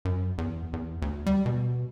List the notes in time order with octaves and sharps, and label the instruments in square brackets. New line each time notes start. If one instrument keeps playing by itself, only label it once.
[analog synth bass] F#2
E2
E2
D2
G3
B2